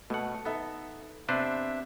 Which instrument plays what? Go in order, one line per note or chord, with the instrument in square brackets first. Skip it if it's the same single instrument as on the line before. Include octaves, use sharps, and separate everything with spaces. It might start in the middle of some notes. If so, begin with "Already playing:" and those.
[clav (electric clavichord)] B2 F#5 [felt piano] A3
[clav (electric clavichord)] B3 [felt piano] D#4 A4 E5
[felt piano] C3 B3 [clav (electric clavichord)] D4 B4 C5 [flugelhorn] E5